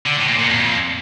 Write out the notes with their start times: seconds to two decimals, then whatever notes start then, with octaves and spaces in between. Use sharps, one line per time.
0.06 D3
0.17 A2
0.28 A#2
0.39 A#2
0.50 F2